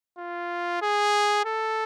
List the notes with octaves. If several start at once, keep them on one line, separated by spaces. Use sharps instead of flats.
F4
G#4
A4